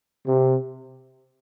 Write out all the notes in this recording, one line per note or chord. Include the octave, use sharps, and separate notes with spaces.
C3